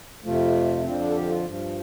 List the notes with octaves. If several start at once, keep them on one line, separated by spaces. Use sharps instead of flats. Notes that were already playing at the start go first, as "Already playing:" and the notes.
F2 C3 F3 A3
F2 D3 F3 C4
D4
A4
G4
F4
G2 F3